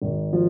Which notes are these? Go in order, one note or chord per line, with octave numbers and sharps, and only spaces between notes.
G#1
F3